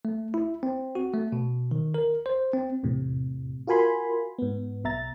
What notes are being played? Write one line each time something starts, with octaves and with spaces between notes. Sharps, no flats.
A3
E4
C4
F#4
A3
B2
D#3
A#4
C5
C4
E2 A2 C3
F4 F#4 A#4 G#5 B5 C6
G#2 B3
B1 B2 E5 A#5 A6